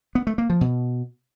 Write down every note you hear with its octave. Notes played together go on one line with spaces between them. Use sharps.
B3
A3
A#3
F3
B2